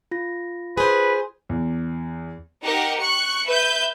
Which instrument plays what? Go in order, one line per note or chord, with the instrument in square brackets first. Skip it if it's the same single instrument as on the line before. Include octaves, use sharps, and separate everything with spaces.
[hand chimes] F4 A#6
[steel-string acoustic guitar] G#4 C5 [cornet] B4
[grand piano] E2
[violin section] D#4 G4 A#4 F#5 A#5
C#6 F#6 C#7
B4 E5 G6